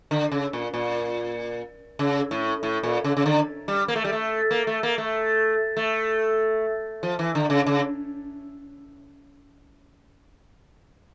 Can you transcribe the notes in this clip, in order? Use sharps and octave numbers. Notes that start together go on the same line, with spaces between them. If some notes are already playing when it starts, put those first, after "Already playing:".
D3
C#3
A#2
A#2
C#3
A2
A2
A#2
C#3
C#3
D3
G3
A#3
A3
G3
A3
A#3
A3
A#3
A3
A3
F3
E3
D3
C#3
C#3